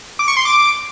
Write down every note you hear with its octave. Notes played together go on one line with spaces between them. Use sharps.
D6
C#6
C6
D6